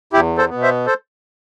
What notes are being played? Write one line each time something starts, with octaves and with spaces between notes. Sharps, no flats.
E2 E4 G4
A4 C5
B2 B3
C5 E5
A4 C5